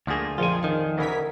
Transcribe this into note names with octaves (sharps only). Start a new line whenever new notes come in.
D2 F3 A3 A#3 G#4
A#1 F2 F3 F4 G#4 G#5
D#3
D2 C#3 E3 A#4 G#6 B6